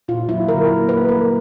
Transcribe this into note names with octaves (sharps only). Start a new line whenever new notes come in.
A#2 F4
F#3 E4
D3 A#4
A#3
G3 B4
A#3 A#4